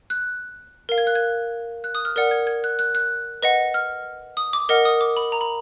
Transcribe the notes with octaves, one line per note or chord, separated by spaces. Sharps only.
F#6
A#4 F5
G#6
F#6
G#6
F#6
D#6
F6
A#4 D5 F#5 F6
G#6
G#6
F#6
F#6
F#6
B4 D#5 F#5
F6
D#6
D6
A#4 D#5 F#5 F6
D#6
D6
B5
A#5
B5